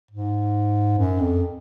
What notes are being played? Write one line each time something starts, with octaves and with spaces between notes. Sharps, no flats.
G#2
F#2
F2